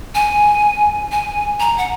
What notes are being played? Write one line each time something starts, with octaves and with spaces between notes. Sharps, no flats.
G#5
G#5
A#5
F#5